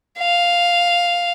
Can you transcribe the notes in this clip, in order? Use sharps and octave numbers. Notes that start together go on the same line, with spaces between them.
F5